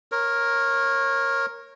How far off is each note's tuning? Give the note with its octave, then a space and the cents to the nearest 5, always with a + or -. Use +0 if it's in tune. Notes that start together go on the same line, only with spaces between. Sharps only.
A#4 +0 C#5 -25